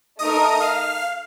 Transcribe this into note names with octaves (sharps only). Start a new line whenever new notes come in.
A3 D#4 A#4 D#5 D#6
F5 F6